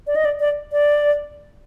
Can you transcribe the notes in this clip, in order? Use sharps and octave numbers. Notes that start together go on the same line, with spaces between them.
D5
D#5
D5
D5
D5